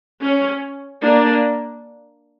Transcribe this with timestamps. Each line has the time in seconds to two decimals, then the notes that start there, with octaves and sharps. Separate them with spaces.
0.22 C#4
1.03 A#3 D4